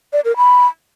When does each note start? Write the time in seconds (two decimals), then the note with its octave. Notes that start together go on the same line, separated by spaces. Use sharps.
0.13 D5
0.25 A#4
0.37 B5